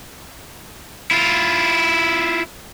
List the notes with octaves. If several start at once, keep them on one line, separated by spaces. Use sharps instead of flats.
E4 F4